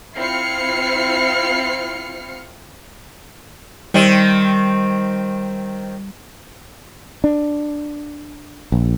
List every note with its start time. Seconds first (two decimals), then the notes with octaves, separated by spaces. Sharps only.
0.17 C4 E4 F4 F6 C7 C#7
3.94 D#3 G3 C4
7.24 D4
8.72 A#1